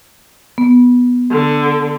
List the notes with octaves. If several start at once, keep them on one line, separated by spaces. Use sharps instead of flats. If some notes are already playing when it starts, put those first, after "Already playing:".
B3
D3